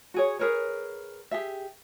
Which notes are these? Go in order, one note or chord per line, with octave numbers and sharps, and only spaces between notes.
F#4 G#4 C#5
G#4 A#4 B4 C#5
G4 G#4 E5